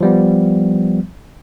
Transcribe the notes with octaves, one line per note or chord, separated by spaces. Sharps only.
F3 G3 B3